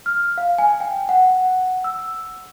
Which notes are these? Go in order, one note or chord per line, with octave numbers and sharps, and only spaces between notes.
F6
F5
G#5
G5
F#5
E6